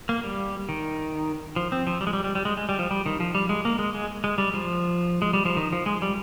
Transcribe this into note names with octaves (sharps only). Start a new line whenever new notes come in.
A#3
G3
D#3
F3
C4
F3
G3
G#3
G3
G3
G3
G#3
G#3
G3
F3
G3
D#3
F3
G3
G#3
A#3
G#3
G#3
G#3
G3
F3
G#3
G3
F3
D#3
F3
G#3
G3